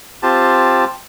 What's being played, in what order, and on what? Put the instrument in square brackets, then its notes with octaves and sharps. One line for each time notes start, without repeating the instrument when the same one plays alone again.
[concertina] C4 F4 G4 A5